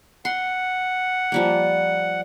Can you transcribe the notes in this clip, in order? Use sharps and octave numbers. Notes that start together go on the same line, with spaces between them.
F#5 C6
F3 G3 A#3